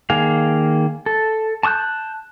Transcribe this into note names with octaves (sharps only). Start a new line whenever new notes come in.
D#3 A#3 G#4 F5
A4
A5 C#6 D#6 F#6 G6